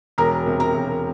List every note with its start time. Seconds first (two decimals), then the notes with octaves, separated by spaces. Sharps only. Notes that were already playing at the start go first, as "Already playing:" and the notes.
0.18 E1 A#4 A#5
0.46 C3
0.60 A#4 A#5
0.75 E1